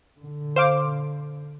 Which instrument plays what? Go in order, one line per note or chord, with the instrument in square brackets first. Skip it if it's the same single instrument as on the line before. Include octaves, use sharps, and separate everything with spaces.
[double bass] D3
[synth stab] C5 F5 D6